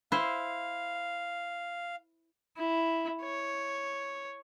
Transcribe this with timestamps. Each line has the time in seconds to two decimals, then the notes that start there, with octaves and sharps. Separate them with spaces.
0.12 E4 C5 F5
2.57 E4
3.22 C#5